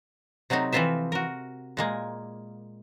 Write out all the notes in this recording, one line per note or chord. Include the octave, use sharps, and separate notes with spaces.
C3 F#3 A3 C4 D#4
E3 F3 C4 F4 C5 E5
F#4 A#4
A#2 G#3 A#3